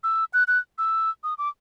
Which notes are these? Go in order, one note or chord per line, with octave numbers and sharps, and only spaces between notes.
E6
F#6
F#6
E6
D#6
D6